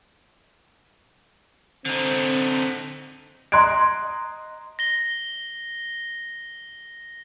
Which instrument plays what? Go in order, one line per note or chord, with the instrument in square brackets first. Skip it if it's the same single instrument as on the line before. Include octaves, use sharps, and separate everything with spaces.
[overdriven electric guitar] D3 D#4 [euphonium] C4
[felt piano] D#5 A#5 C6 F#6 G#6 D7
[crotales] A#6 G7